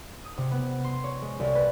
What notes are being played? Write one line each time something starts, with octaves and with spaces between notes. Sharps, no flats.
D#6
C3
B3
C6
C#5
G#3
C2
B4